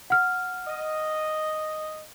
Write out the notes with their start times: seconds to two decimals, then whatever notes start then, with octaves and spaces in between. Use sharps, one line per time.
0.10 F#5 F6
0.67 D#5